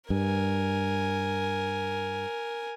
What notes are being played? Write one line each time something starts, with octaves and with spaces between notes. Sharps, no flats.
G2 A#4 G#5